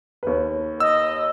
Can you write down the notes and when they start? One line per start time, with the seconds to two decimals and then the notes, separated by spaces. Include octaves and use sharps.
0.23 D#2 B4
0.80 D#5 E6